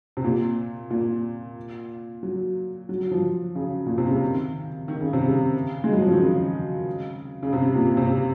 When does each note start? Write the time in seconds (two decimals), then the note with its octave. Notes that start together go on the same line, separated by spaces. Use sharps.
0.17 C3
0.24 A#2
0.90 A#2
2.23 F#3
2.89 F#3
3.11 F3
3.55 C#3
3.86 A#2
3.98 C3
4.09 C#3
4.21 D#3
4.88 D#3
5.00 C#3
5.13 C3
5.26 C#3
5.84 G#3
5.93 F#3
6.02 F3
6.11 D#3
6.20 C#3
7.43 C#3
7.53 C3
7.75 A#2
7.97 C3